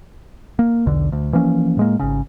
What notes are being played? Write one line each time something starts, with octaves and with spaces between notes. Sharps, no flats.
A#3
B1 E2 D3
D2
E3 F3 A#3 C#4
A2 G#3 A#3
G#1 C#3